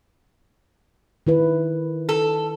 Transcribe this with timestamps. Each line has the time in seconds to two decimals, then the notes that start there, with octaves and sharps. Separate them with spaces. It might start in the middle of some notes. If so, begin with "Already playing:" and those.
1.27 D#3 E4 B4
2.09 A4